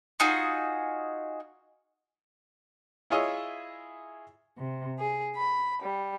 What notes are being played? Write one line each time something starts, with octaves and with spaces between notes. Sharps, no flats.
D#4 F4 F#4 G#4
E4 F4 G#4 C#5 D#5 E5
C3
G#4
B5
G3